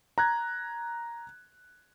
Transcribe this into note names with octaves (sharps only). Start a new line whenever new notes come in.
A#5 F#6 G#6